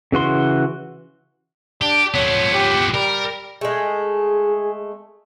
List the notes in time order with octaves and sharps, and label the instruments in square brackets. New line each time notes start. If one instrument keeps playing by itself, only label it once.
[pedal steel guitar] C#3 E3 F#4 C6
[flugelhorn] D4 [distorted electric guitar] G4
[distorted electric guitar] F3 B3 [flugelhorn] C#5
[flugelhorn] G4
[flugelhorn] G3 [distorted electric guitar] A#4
[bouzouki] G#3 A3 [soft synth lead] G#4